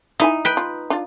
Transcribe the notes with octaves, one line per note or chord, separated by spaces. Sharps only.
D#4 E4 E5 G#5
B4 G5
F4
D4 F4